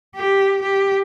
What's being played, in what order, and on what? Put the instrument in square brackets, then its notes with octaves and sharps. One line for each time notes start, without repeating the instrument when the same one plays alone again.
[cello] G4
G4